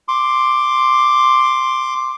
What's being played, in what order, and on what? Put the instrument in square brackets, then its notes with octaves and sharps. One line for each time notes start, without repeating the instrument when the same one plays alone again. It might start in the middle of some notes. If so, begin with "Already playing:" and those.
[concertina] C6 D6